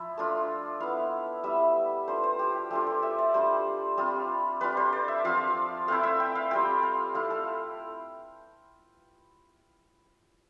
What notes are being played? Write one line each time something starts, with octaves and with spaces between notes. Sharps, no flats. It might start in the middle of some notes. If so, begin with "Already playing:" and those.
Already playing: F3 E4
A3 D4 F4
B3 E4 F5
G3 B3 E4 E5
A3 D4 F4 C5
C5
G4
G4
A3 D4 F4 G4
A4
E5
D5
G3 D4 F4 C5
G3 C4 F4
G3 D4 F4 B4
C5
D5
E5
F3 C4 F4 F5
A3 C4 E4 F5
E5
G5
F5
G3 C4 F4 G5
F5
A3 E4 F5
A4